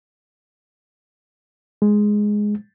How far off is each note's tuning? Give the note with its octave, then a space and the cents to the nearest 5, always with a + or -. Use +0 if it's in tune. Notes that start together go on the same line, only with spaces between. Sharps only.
G#3 +0